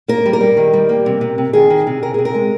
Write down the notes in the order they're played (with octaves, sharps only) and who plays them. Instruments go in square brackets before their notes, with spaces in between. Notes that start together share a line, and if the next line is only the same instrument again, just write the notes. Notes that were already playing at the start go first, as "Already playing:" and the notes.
[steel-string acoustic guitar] A#3 A#4
G3
A#4
G3
D#3
G3
A#3
C3
C3
C3
D#3 G#4
D#3
C3
C3 A#4
C3 G#4
A#4
G#3